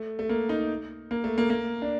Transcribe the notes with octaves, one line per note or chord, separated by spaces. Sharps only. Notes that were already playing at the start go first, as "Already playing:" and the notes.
Already playing: A3
A3
A#3
D#4
A#3
A3
A#3
A#3
D4